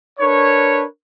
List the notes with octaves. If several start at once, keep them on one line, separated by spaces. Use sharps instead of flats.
D4 A#4 B4 C#5